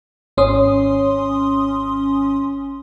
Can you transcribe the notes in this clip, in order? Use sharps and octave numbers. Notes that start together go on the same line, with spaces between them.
G#1 C#4 C6 D#6